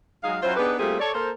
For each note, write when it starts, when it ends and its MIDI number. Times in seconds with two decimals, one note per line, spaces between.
0.24 0.38 54
0.24 0.38 56
0.24 0.38 63
0.24 0.38 68
0.24 0.38 77
0.43 0.56 54
0.43 0.56 61
0.43 0.56 64
0.43 0.56 65
0.43 0.56 72
0.57 0.74 59
0.57 0.74 62
0.57 0.74 63
0.57 0.74 67
0.57 0.74 68
0.57 0.74 71
0.78 0.99 55
0.78 0.99 57
0.78 0.99 58
0.78 0.99 60
0.78 0.99 65
0.78 0.99 68
1.00 1.14 69
1.00 1.14 73
1.00 1.14 74
1.14 1.30 58
1.14 1.30 69
1.14 1.30 70
1.14 1.30 72